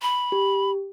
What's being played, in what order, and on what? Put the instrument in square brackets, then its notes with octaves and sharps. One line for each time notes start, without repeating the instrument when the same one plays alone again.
[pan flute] B5
[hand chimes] G4